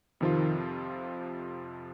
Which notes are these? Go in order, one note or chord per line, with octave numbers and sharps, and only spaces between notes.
F2 C3 D#3 F3 C4 F4